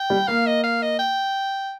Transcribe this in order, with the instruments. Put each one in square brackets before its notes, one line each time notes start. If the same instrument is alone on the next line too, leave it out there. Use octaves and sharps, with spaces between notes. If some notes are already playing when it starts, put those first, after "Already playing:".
Already playing: [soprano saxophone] G5
[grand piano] G3
[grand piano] A#3 [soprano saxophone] F5
[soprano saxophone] D#5
F5
D#5
G5